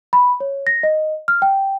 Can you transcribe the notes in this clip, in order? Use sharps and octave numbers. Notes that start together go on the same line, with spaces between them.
B5
C#5
A#6
D#5
F6
G5